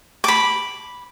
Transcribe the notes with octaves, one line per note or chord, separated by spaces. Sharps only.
B5 D6